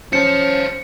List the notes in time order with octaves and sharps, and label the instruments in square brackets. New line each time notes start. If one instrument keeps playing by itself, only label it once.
[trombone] C#4 [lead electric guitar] C5 A5 [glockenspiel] C#7